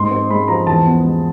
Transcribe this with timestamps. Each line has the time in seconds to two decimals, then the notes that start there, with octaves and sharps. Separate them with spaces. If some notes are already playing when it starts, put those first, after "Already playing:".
Already playing: G#2 G#3 C6
0.11 C4
0.30 G#3 B5
0.48 F3 A#5
0.67 E2 A5
0.86 B3
1.04 G#3